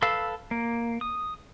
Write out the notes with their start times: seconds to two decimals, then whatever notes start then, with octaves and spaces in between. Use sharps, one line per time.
0.02 A4 B4 F5 E6
0.51 A#3
1.01 D#6